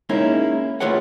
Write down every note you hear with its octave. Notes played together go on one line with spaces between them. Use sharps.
G#3 A#3 C#4 D#4 E4
A3 F4 G#4 B4 C#5 F#5